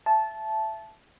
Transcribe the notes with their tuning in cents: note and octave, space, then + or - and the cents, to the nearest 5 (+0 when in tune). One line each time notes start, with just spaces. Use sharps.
E5 +20 A5 -15